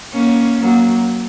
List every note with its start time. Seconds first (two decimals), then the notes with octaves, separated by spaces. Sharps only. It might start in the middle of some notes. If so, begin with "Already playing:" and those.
0.13 A#3 C#4
0.59 F#3 A#3